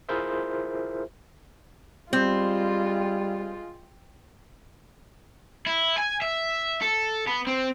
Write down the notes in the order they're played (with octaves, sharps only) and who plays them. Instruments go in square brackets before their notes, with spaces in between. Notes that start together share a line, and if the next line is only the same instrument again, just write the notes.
[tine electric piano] E4 F4 G#4 A#4 C5 E5
[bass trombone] G3 [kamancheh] G#3 F4 [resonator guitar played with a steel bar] C4
[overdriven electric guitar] E4
G#5
E5
A4
B3
C4